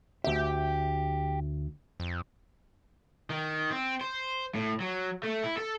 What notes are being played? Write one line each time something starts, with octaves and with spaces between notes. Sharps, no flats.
D2 G4 E5
F2
D#3
C4
C5
A2
F#3
A3
E4
A4